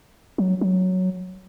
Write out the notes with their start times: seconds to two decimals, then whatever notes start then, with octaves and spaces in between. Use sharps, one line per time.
0.38 F#3
0.61 F#3